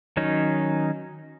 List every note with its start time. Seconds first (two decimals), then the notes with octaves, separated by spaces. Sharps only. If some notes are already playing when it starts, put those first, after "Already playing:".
0.17 D#3 F#3 C#4 D#4